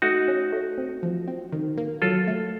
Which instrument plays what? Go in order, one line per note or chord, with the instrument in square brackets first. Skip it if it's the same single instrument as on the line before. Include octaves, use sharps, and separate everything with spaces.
[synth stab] A3 [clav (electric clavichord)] D#4 F#4
[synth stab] C#4
A3
C4
F3
C4
D#3
A#3
[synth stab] F#3 [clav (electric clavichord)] F4 A4
[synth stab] A3